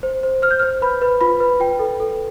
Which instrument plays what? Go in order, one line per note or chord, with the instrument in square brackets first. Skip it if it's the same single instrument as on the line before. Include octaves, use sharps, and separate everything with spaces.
[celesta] C5
C5
C5 F6
G6
C5 F6
B4 B5
B4
F4 B5
B4
F4 G5
A4
A4